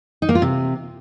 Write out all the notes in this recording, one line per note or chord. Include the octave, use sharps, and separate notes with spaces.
D#4
A#3
F4
C3